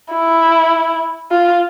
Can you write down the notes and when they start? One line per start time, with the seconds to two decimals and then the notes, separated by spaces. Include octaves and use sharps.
0.13 E4
1.31 F4